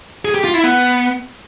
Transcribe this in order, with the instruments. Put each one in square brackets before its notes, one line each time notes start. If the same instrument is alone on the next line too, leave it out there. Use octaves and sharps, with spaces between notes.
[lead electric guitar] G#4
G4
F4
E4
B3